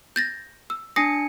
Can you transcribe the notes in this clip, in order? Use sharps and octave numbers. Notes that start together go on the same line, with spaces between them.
G6 A6 A#6
E6
D4 G#5 D#6 A#6 C7 C#7